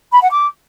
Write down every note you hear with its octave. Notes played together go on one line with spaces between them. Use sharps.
B5
F#5
D6